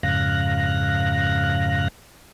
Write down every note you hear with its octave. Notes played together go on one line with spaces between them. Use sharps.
F2 G#2 C#3 F5 F#6 A#6